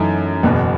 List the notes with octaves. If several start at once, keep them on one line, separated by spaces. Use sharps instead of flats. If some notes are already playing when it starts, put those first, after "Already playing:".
Already playing: F#2 E3 A3 D#4
F#1 E2 B2